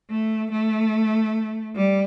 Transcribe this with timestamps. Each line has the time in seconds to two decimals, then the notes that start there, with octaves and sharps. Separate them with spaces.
0.10 A3
0.52 A3
1.76 G3